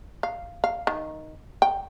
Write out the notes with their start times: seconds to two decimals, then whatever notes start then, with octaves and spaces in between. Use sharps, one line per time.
0.23 F5
0.64 F5
0.87 D#3
1.62 G5